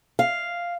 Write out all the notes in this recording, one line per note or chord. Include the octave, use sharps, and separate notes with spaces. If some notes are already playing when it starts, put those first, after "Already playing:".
F5